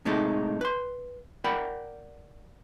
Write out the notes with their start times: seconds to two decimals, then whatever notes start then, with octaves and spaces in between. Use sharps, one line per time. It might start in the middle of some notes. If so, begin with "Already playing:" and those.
0.05 A2 C3 G#3 A3 D#4 A4
0.61 B4 C6
1.44 A#4 D5 F#5 G5 B5